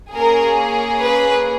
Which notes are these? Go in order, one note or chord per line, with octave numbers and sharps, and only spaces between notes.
A#3 C#4 G#4 A#4
B4